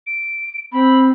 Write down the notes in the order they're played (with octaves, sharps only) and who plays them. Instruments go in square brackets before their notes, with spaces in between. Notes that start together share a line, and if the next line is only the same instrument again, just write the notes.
[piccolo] D7
[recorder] C4 [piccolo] B5